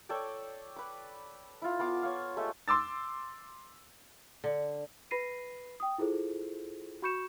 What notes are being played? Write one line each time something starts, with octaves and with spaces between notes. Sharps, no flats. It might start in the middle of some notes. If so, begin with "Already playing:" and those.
A4 C#5 D5 G5
B4 D6
E4 F4
B3 F4 A5 D6
C#5 F5
G#3 A3 G4 A4
C6 D6 E6 A6
D3
B4 B5 A#6 C7 D#7
G5 D#6
E4 F4 G#4 A4 C5
F#4 B5 C#6 G6 C#7 E7